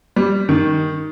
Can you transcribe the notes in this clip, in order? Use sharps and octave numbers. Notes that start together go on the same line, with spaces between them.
G3
D#3